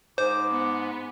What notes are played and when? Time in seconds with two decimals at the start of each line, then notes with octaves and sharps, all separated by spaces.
0.18 G#2 C5 D6
0.50 B3